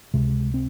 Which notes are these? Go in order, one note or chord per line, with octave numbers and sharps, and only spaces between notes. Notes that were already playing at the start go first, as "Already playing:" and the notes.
C#2 C3 G#3
C4